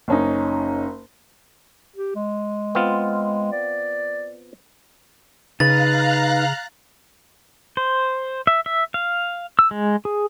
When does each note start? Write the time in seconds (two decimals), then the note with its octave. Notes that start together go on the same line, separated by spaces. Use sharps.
0.08 F#1 C#4 D#4
1.96 G4
2.15 G#3
2.75 B3 C4 F4
3.52 D5
5.60 C#3 D#4 B4 F5 A#5 F#6 A6
7.77 C5
8.47 E5
8.66 E5
8.94 F5
9.59 E6
9.71 G#3
10.05 G#4